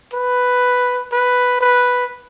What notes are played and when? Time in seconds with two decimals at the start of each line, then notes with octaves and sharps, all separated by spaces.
0.14 B4
1.12 B4
1.61 B4